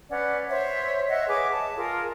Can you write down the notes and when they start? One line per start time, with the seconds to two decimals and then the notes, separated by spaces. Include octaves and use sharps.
0.09 C#4 B4 D5 F#5
0.49 C5 C#5 E5
1.08 C#5 D#5 E5 F#5
1.28 G#4 B4 C#5 D6
1.51 A5
1.77 F4 G#4 A#4